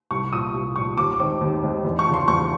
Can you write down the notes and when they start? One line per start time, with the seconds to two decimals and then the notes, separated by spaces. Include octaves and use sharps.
0.11 C2 C#6
0.32 A#2 F3 D#6
0.54 C2
0.76 A#2 F3 C#6
0.97 D#2 D6
1.20 D#3 G#3 C4 D6
1.41 D#2
1.63 D#3 G#3 C4
1.84 E2
1.99 C#6
2.06 C#3 F3
2.14 C6
2.28 E2 C#6